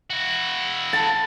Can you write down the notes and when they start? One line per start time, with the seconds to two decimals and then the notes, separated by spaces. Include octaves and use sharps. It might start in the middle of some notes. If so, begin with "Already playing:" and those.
0.10 E4 F#4
0.93 A5